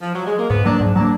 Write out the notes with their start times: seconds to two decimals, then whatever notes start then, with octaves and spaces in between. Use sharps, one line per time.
0.02 F3
0.15 F#3
0.27 G#3
0.38 A#3
0.50 G#2 B3
0.65 F#3 A#3 D4
0.81 G#2
0.95 F#3 A#3 D4